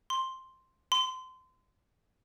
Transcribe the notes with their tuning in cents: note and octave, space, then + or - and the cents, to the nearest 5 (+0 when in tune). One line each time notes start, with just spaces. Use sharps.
C6 +5
C6 -25